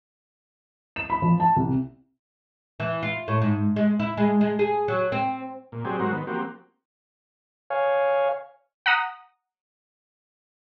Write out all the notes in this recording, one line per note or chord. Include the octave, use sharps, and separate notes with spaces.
E7
B5
F3
A5
C2
E3
F4
A2
G#2
G#3
E4
G#3
G#3
G#4
F#3
C4
A#2
F#3 C4 G4 G#4 D5
G#2 F#3 F#4 A#4 C5
D#3 B3
F3 A#3 C4 F#4 G4
C#5 F5 G#5
F#5 A#5 D#6